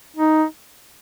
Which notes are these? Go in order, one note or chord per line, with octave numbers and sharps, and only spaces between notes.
D#4